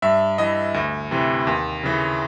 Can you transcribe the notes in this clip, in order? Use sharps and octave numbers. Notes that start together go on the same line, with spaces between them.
G2 E5
E3 D#5
D2
C3 E3
D#2
C#3 E3